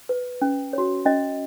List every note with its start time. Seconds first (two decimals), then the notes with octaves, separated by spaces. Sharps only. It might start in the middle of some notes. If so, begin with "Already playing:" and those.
0.09 B4
0.42 C#4
0.73 F#4 C#5
1.06 C#4 D#5